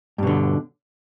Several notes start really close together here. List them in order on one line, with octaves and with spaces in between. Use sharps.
G2 B2 D3